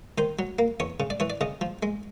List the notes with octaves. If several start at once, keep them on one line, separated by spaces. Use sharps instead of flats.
D#3 C5
F#3
A#3
E2 C#5
C#3
D5
E3 C#5
D5
C#3 D#5
F3
G#3